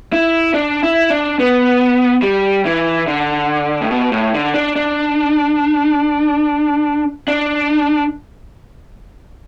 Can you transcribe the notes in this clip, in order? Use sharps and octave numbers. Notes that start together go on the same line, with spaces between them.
E4
D4
E4
D4
B3
G3
E3
D3
A2
B2
A2
D3
D4
D4
D4